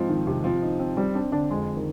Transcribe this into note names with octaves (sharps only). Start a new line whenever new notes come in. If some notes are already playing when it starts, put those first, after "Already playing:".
Already playing: G#2 F3 C4
D#3
C3
F3 C4
D#4
C4
G3 C4
C4 D4
D3 D4
F2 G#3
D#3